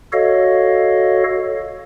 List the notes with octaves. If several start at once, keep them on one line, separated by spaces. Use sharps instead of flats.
F#4 A4 C#5 D#5 F5